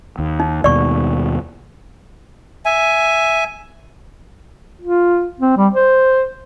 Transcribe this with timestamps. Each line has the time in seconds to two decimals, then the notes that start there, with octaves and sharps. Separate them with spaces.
0.18 D#2
0.40 D#4
0.64 D#2 B2 D5 C#6
2.65 E5 G#5
4.81 F4
5.40 C4
5.57 G3
5.73 C5